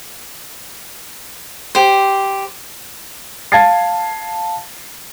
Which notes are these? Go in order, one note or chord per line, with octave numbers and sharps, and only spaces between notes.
G4 C5
F5 A5 G#6 A6 C7